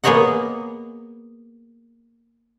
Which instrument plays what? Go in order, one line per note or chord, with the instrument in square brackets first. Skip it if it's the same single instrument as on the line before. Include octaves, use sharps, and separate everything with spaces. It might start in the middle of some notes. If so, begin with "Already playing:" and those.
[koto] A#3 B3 G#4 C#5 D#5 F#5